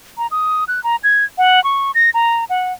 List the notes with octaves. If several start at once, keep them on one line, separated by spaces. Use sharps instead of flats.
A#5
D#6
F#6
A#5
G#6
F#5
C#6
A#6
A#5
F#5